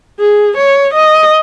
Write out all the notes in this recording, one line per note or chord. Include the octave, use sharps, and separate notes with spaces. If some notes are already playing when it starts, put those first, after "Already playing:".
G#4
C#5
D#5